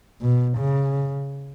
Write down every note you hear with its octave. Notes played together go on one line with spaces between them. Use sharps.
B2
C#3